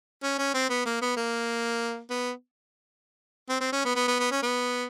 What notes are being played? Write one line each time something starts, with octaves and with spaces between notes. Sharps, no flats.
C#4
C#4
C4
B3
A#3
B3
A#3
B3
C4
C4
C#4
B3
B3
B3
B3
C#4
B3